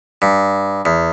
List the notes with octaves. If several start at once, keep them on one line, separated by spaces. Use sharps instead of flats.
G2
E2